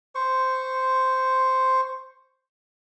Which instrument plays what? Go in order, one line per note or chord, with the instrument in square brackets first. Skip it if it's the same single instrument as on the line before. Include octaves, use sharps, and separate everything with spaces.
[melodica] C5 C#6